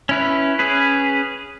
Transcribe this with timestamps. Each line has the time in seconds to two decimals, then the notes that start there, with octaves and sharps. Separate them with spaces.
0.09 C#4 E4 B4
0.59 C#4 G#4 B4